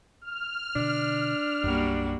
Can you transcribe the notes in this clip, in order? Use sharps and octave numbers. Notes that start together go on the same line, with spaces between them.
F6
B2 D3 D4
B1 F#2 G3 A#3 F#4